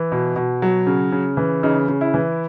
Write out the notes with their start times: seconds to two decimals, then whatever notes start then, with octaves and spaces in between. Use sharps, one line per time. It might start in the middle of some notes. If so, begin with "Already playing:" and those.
Already playing: E3
0.12 B2
0.36 B2
0.62 F#3
0.87 C#3
1.12 C#3
1.37 E3
1.63 C#3 D#4
1.88 C#3
2.01 E4
2.14 E3